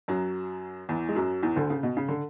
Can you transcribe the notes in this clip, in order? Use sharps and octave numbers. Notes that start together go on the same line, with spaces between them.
F#2 F#3
E2 E3
G#3
F#2 F#3
E2 E3
D2 D3
C#3
B2
C#3
D3